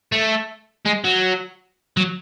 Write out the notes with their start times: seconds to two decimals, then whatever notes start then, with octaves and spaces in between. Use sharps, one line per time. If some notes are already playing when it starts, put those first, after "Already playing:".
0.12 A3
0.85 G#3
1.04 F#3
1.97 F#3